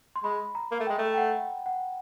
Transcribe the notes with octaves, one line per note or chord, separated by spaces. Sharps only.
C6
G#3 B5
A#5
A#3
A3
G#3 G5
A3
G5
F#5
F#5